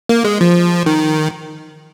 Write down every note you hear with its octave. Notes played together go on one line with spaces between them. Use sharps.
A#3
G#3
F3
D#3